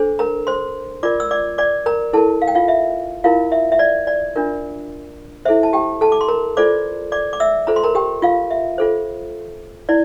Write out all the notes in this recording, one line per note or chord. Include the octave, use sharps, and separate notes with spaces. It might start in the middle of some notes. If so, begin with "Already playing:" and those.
Already playing: D4 A4 C5
A#4 A#5
C5 C6
F4 A#4 D5 D6
E6
D5 D6
D5 D6
A#4 A#5
E4 A4 A#4 A5
F5
G5
F4 F5
E5
E4 F4 A#4 F5
E5
E5
D5
D5
D4 F4 A#4
E4 A4 C5 E5
A5
G4 G5
A4 A5
D6
C6
A#4 A#5
F4 A4 C5 D5 D6
D5 D6
D6
E5 E6
F4 A4 C5 A#5
C6
A#4 A#5
G4 G5
F4 F5
E5
F4 A4 C5
E4 D5